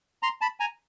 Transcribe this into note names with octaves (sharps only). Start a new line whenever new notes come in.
A#5 C6
A5 B5
G#5 A#5